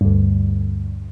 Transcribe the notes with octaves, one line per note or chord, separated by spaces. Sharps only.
D2 G2